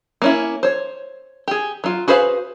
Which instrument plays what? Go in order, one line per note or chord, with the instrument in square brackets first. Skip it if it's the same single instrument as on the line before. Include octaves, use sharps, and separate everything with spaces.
[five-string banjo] A#3 C#4 E4
C5 C#5
G4 G#4
F#3 F4
F#4 G#4 B4 C5 F5